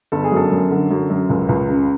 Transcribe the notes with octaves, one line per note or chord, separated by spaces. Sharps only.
G1 A4
G#4
F#2 A4
F#2
D3
F#2
F#2
C#2
C#2
C#3